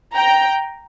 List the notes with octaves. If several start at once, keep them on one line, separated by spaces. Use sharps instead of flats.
G5 A#5